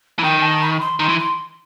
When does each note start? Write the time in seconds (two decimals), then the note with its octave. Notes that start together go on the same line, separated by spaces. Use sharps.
0.19 E3
0.24 D#3 G5
0.42 A5
0.62 B5
0.81 C6
1.00 D#3 C6
1.09 E3
1.19 C6